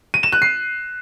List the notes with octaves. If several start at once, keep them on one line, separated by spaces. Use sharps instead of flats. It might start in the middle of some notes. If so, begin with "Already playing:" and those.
D#7
E7
F#6
C7